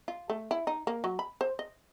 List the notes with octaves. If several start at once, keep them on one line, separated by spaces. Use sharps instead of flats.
F4
A3
E4
D#4
A#3
F#3
B5
C5
D#5